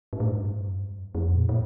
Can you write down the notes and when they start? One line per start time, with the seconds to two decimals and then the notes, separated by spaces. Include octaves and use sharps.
0.13 G#2
0.20 A2
0.29 G#2
0.40 G2
0.67 F#2
1.15 F2
1.35 A#2
1.49 A#2